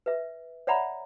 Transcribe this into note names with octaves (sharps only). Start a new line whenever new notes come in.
B4 E5
C#5 D5 E5 F#5 A#5 B5